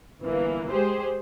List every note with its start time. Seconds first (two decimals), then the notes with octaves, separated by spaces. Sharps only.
0.23 G1 E3 A#3
0.68 G#3 G4 G#4 C5